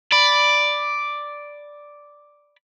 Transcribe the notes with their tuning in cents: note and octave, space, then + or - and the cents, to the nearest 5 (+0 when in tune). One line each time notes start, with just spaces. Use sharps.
D5 +0 B5 +0